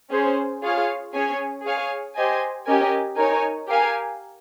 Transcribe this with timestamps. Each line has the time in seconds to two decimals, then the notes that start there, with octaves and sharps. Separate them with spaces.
0.11 C#4 G#4 C5
0.62 F4 G#4 C#5 F5
1.13 C#4 G#4 C#5 G#5
1.63 G#4 C#5 F5 G#5
2.15 G4 C5 D#5 G#5
2.66 C#4 G4 A#4 D#5 G#5
3.16 D#4 A#4 C#5 G#5
3.68 G4 A#4 F5 G#5